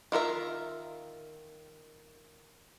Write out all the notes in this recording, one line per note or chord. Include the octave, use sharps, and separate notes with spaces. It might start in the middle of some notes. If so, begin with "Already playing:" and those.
D#3 F4 A#4 E5